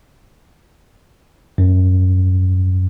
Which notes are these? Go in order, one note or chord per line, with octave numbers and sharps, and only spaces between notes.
F#2